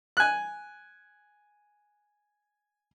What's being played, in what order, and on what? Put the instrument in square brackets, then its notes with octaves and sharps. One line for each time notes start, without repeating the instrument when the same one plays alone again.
[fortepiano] G#5 F#6